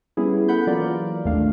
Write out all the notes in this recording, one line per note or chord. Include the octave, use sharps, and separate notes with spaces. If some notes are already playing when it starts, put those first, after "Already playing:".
G3 B3 C#4 E4 G#4
A4 F#5 B5 G6
E3 F#3 A#3 F4 A#4 D5
G#1 D#2 D#3 A3 D4 F5